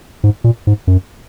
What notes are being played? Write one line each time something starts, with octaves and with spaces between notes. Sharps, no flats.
G#2
A#2
G#2
F#2